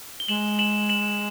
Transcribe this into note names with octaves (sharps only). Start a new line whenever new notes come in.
G7
G#3 E7 F#7
E7 F#7
E7 F#7